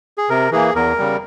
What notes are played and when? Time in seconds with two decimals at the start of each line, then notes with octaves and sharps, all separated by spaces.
0.18 G#4
0.29 C3 A#4
0.52 E3 A#3 G#4
0.75 E2 A#4
0.99 C#3 G3